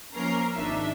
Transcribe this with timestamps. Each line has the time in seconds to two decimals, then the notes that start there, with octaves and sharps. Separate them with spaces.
0.13 F3 A#3 C#4 A#4 A#5 C7
0.53 G#1 D4 D#4 E5